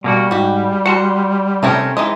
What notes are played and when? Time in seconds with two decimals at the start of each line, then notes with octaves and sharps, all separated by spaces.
0.04 B2 G3 A#3 F#4
0.31 G#2 F#4 G4
0.86 F#4 F#5 A5 C6
1.63 C3 A3 C4 C#4 D#4 A#4
1.97 E3 G#3 D#4 D#5